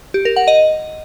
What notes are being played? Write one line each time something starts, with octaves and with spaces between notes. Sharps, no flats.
G4
A#4
F#5
D#5